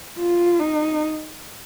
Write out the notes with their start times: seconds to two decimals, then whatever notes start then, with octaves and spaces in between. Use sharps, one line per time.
0.19 F4
0.59 D#4